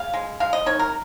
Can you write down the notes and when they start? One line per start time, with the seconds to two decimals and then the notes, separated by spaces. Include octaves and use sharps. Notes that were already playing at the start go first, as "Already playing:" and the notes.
Already playing: C#3 F5
0.14 G#3
0.40 G#3 F5
0.53 D#5
0.66 D#3 C#5
0.79 A#4